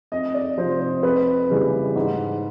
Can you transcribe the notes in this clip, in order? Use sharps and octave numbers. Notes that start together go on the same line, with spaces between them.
F2 D#5
D5
C3 F3 C5
C5
F2 B4
C#3 E3 G3
G#2